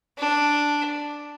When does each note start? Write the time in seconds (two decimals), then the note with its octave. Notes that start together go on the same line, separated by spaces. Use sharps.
0.18 D4